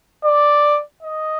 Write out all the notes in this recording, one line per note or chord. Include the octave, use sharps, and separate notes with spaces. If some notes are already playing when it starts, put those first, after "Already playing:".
D5
D#5